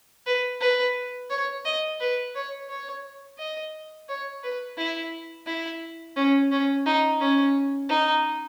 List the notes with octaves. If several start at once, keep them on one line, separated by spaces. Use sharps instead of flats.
B4
B4
C#5
D#5
B4
C#5
C#5
D#5
C#5
B4
E4
E4
C#4
C#4
D#4
C#4
D#4